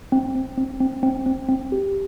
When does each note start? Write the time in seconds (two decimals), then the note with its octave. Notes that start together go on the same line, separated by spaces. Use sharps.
0.12 C4
0.35 C4
0.58 C4
0.80 C4
1.03 C4
1.26 C4
1.49 C4
1.72 G4